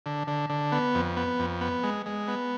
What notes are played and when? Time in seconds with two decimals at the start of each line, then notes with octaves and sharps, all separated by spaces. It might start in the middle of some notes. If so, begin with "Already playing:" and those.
0.06 D3
0.27 D3
0.50 D3
0.72 B3
0.95 F2
1.17 B3
1.39 F2
1.61 B3
1.83 G#3
2.06 G#3
2.28 B3